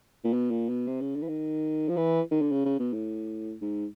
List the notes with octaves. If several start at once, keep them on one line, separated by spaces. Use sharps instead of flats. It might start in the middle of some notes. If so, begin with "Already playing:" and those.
A#2
B2
A#2
B2
C3
C#3
D3
E3
D#3
F3
E3
D#3
D3
C#3
C#3
B2
A2
G#2